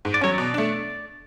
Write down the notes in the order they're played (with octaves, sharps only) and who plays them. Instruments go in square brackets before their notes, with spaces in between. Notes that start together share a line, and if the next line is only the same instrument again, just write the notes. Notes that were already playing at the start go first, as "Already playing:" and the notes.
[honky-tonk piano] G#2
[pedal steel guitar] D5
[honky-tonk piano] F#3 C#4 [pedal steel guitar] C#5
[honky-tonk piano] B2 [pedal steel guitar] D5
[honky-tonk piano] A3 D4